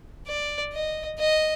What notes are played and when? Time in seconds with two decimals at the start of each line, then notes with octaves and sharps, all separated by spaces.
0.27 D5
0.73 D#5
1.19 D#5